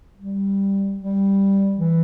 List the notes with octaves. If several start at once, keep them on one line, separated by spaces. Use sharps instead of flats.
G3
G3
E3